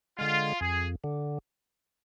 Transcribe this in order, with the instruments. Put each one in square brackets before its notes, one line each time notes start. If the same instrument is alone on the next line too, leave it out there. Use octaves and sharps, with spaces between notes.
[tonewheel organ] D3 G#3 [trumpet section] F4
[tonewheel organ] F2 [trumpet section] G#4
[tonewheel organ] D3